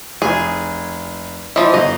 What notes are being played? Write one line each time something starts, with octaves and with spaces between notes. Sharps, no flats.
F1 G#4
E3 F3 D#5
G1 D#5